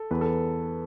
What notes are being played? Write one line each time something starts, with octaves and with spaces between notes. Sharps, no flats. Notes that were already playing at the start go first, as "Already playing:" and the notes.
Already playing: A4
E2 B4
A4